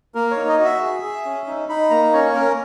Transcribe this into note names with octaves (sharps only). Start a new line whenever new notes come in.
A#3 A#4
C#5
D#4
D#5
F#4
E5
G#4
G#4
C#4
D#4
D#4 B5
A#3 A#5
C#4 C#5
C#4 A#4